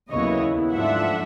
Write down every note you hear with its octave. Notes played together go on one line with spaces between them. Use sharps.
D#2 C#3 F#3 B3 E4 C#5 D#5
G#2 F3 A3 D4 F4 E5 F#5